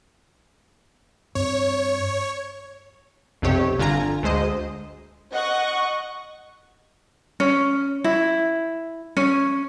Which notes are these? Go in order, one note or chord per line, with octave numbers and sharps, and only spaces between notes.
G2 C4 C#5
B1 F2 C3 G4 C#5
G1 D3 F4 G#5 A#5
D2 G#3 C5 D#5
D#5 F#5 C#6
C#4
E4
C#4